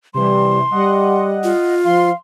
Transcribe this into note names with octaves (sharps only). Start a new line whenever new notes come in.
C3 E3 G3 C6
G3 D#5 F#5
F4
F3 F5 C6